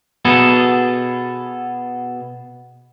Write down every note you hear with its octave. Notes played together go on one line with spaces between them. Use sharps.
B2 B3 G#4 A4